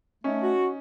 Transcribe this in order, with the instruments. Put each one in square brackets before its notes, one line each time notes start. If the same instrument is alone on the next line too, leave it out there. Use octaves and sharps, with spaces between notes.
[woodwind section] A3 [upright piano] C#4 D#4
[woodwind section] F#4